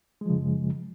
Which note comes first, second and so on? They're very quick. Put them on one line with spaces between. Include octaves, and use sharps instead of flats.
G#3 F3 C#3 F#2